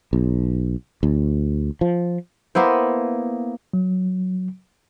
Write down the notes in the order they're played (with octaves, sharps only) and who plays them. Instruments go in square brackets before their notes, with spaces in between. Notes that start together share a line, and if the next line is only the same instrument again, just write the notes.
[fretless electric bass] B1
D2
F3
[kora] A#3 B3 E4 C5
[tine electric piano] F#3